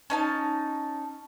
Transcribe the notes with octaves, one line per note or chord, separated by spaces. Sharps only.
C#4 D#4 A5